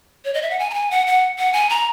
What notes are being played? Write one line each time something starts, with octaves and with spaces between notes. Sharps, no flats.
C#5
D#5
E5
F#5
G#5
A#5
G#5
F#5
F#5
F#5
G#5
A#5